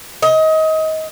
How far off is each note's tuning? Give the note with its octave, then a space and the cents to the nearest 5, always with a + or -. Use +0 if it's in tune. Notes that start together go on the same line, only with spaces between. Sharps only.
D#5 +25